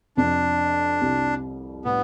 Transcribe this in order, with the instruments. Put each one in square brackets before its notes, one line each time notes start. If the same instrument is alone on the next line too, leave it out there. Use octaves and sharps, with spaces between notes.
[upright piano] F2 C3 F3 [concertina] D4
[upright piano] C2 C3 G3
[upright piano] A2 G3 D4 [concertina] B3